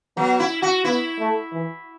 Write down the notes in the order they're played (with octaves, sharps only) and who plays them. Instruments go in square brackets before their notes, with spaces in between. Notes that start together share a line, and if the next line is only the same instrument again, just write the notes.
[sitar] F#3 [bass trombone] B3
[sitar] E4
F#4
[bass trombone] B3 [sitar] E4
[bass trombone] A3
E3